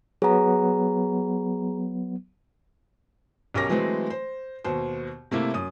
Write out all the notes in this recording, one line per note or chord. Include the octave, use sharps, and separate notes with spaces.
F#3 B3 G#4 A#5
B1 C#4 G4 A#4 D6 A#6
E3 F#3 G#3 A3 C4
C5
D#2 B2 C5
C3 A3 A#3 E4
F#2 D#6